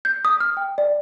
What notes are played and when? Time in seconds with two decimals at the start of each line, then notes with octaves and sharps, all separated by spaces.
0.05 G6
0.25 D#6
0.40 F6
0.57 G5
0.78 D5